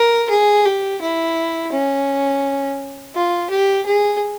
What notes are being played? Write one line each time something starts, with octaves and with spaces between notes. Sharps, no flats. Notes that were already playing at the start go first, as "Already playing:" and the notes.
Already playing: A#4
G#4
G4
E4
C#4
F4
G4
G#4